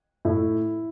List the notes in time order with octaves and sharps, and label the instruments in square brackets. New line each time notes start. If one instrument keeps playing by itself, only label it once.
[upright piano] A2 [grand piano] E4